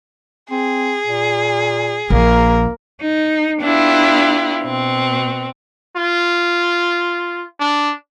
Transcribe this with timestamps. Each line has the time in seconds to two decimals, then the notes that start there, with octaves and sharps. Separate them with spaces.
0.51 C4 G#4
1.06 A#2
2.10 A#1 A#3 A#4
3.01 D#4
3.61 B3 D4 E4 F4 G4
4.64 B2 C4
5.96 F4
7.60 D4